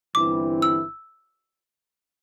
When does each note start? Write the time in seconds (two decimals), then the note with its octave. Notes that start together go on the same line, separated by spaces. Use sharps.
0.15 G1 G2 E3 C4 E4 D6
0.62 E6